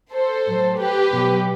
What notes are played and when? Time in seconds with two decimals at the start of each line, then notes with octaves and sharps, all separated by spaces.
0.12 A4 C5
0.45 A2 F#3
0.77 G4 B4
1.10 B2 F#3